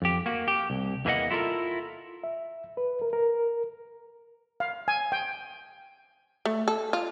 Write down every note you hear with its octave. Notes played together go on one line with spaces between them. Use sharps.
F2 G4
A#3 F#4
G4
C2
E2 E3 A#3 G#4 D#5 F#5
E4 F4 A4 A#4
E5
B4
A#4
A#4
F5
G#5
G5
A3
A4
F4